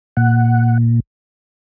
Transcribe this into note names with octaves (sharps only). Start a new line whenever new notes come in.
A#2 F#5